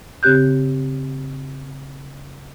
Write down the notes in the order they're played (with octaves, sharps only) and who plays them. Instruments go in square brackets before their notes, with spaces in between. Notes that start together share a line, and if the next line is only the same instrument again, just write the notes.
[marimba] C#3 C4 G4 F#6 G6